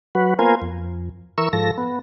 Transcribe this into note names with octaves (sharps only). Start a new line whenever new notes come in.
F#3 F#4 B4
A#3 B3 F4 A#4 C5 G#5
F2
E3 A#4 C#6 E6
G#2 F3 A4 A#6
B3